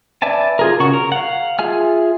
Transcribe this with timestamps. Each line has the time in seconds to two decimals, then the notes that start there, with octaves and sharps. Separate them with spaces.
0.22 B4 D5 E5 G#5 A5
0.59 F4 G#4 A#4
0.80 C#3 F#4 C#6
0.93 A#4
1.12 F5 F#5
1.59 F4 G#4 E5 G#5 F6